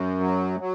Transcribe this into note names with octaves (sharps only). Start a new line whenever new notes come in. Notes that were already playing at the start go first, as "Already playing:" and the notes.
Already playing: F#2
F#3
F#3